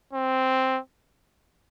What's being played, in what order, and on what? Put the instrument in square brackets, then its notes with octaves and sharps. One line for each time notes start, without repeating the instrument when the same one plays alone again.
[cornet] C4